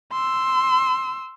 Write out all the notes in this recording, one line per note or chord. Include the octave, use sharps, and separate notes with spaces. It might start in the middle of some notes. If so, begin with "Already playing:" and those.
C6 E6